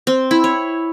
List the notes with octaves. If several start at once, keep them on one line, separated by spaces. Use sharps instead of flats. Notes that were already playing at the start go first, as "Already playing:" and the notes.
C4
E4
C#5